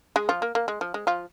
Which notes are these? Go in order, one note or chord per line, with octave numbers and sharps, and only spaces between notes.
G#3 G#4
F3 F4
A#3
A#3
G#3
F3
G#3
F3 F4